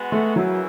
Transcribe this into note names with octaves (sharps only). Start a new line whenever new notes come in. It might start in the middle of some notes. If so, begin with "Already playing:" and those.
Already playing: G#3 B3 F#4
A3
F#2 C#3 E3 F#3